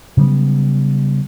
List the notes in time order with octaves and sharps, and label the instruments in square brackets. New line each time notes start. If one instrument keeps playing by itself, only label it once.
[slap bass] C#3 F#3 G3 B3